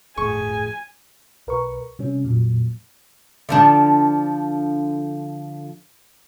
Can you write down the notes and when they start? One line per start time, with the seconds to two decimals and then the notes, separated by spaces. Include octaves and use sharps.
0.17 G1 F2 A2 G#4 G#5 C#6
1.47 B1 A#4 B4 C#6
1.99 C3 G3 C#4
2.24 F2 A#2 F#3
3.49 D3 F3 D4